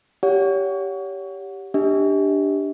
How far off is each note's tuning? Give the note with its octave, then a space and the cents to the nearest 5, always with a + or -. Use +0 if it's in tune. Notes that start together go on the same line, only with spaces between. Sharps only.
G4 -5 C#5 +25 F#5 -20
D4 +0 G4 +0 D#5 +40